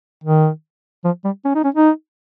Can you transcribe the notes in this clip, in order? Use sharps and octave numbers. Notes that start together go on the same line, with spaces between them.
D#3
F3
G3
C#4
D#4
C#4
D#4